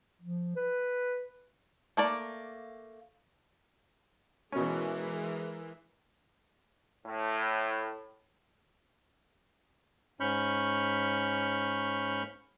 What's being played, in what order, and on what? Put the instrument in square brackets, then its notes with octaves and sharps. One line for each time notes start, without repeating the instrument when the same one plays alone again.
[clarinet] F3
B4
[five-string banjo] A3 A#3 D5
[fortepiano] B2 C#4 [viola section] E3 G#3 A#4
[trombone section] A2
[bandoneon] G#2 C#4 B5 C#6 F6 G6